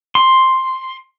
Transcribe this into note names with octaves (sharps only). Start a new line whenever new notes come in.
C6